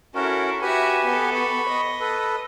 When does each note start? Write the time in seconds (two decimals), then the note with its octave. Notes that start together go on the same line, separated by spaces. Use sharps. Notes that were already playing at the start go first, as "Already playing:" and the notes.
0.15 C#4 E4 F#4 A4 A#4
0.61 F#4 G4 B4 E5 G#5
1.05 B3 A4
1.35 B5 C#6
1.69 D#5
2.01 A4 B4